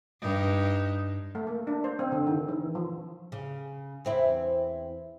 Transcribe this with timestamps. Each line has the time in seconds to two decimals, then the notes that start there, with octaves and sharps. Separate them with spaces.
0.21 G2 D#4
1.35 A3
1.47 A#3
1.67 D4
1.84 C5
1.99 C4
2.12 D3
2.27 D#3
2.48 E3
2.75 F3
3.32 C#3
4.05 E2 C4 E4